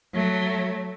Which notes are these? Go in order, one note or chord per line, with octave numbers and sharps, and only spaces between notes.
F#3 A3